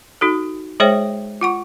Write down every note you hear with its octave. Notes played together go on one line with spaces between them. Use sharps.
D#4 F#4 A4
G#3 G#4 C5 C#5 E5 G5
F4 F#5 C#6